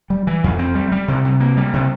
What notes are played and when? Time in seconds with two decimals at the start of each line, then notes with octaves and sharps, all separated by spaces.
0.10 G3
0.27 E3
0.44 F2
0.59 C4
0.75 G3
0.92 G3
1.08 C3
1.25 C3
1.40 A#3
1.57 G3
1.73 C3